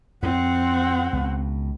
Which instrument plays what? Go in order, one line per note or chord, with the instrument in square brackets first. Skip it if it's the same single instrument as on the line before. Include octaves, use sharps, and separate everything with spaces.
[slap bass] F2 [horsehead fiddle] C4 F#5
[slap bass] C#2 B2